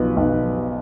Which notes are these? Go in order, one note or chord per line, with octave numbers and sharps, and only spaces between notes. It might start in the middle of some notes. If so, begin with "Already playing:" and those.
Already playing: B1 F3 B4
B1